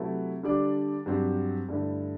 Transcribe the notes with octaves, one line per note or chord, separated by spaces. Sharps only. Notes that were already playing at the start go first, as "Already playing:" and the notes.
Already playing: C3 F#3 A3 E4 B4
D3 G3 D4 A4 D5
G2 F#3 C4 G4
G2 D3 A3 E4